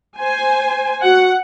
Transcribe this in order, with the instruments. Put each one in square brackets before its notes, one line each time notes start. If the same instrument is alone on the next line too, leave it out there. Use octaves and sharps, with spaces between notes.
[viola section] C5 G#5
[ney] F#4 [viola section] F#5